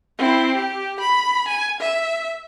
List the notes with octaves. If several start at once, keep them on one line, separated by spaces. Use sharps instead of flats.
C4 E4
G4
B5
G#5
E5